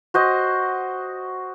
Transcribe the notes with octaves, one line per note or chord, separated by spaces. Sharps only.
F#4 C5 D#5